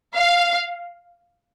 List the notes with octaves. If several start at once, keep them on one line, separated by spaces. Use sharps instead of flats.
F5